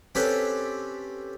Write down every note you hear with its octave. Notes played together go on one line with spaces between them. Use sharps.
C4 C#4 G4 A4 B4